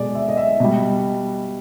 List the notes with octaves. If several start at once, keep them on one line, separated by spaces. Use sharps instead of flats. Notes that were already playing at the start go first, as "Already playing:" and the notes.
Already playing: B2 G#3 D5
E5
D#5
E5
B2 G3